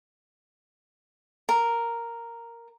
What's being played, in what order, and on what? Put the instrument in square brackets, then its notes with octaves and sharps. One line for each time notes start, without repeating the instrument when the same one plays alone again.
[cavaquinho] A#4